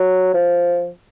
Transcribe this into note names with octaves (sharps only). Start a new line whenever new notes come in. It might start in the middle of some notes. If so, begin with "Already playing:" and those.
Already playing: F#3
F3